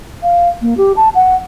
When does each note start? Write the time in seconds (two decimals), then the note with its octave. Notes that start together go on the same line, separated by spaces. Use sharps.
0.23 F5
0.62 A#3
0.77 G4
0.96 A5
1.15 F#5